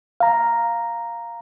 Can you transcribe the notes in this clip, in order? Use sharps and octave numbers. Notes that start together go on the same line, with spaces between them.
F5 A#5